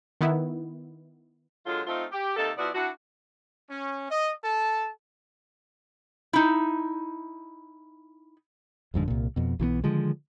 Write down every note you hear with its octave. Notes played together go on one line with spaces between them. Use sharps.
D#3 B3 E4
D3 F#3 G#3 F4
A3 C4 D#4 F4
G4
C3 A#3 D#4 A4
F3 B3 E4 F#4 D5
D4 E4 F#4
C#4
D#5
A4 A5
D#4 E4
G#1 F2 G#2 D3
C2 A#2
F2 B2
B1 E3 F3 B3
D3 D#3 F3 G#3